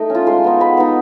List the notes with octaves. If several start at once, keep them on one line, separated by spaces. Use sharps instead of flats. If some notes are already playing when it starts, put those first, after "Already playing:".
Already playing: A3 D#4
C#4 F4
G#3 C6
B3 D#4
G#3 B5
B3 D#4